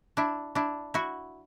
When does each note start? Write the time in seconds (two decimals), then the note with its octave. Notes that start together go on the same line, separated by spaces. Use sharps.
0.17 D4 E4
0.55 D4 E4
0.94 E4 F#4